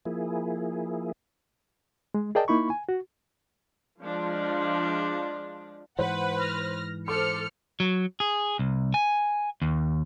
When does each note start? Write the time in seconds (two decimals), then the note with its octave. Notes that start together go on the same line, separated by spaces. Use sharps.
0.05 F3 A#3 E4 G#4
2.14 G#3
2.35 G#4 A#4 D5 D#5 G5 A5
2.48 A#3 D#4 E4 B5 C#6
2.70 G#5
2.89 F#4
4.01 F3 G#3 D4
5.99 G#2 E3 B4 C5 F#5
6.39 F6 A#6
7.08 A4 C5 D6 F6 C#7
7.80 F#3
8.20 G#4
8.59 C2
8.94 G#5
9.62 D#2